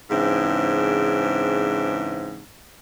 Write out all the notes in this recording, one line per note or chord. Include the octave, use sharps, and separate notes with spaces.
G#2 C#3 E3 C4 D4